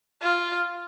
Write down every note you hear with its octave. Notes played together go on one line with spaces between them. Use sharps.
F4